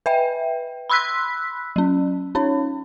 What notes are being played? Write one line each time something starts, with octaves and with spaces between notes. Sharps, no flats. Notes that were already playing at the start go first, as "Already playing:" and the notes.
B4 E5 G5
B5 C6 E6 F#6 B6
F#3 C#4
C#4 D#4 C#5